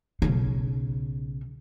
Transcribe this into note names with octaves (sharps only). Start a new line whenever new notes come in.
B1 C#3